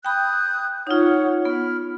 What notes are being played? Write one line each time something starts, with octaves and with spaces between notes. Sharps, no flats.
G5 B5 D#6 F#6 G6
D#4 F4 C#5 F#5
B3 B5 F6